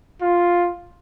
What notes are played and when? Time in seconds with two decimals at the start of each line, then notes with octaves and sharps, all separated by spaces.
0.22 F4